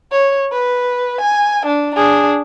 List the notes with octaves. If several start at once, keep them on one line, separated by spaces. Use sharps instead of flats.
C#5
B4
G#5
D4
D4 G#4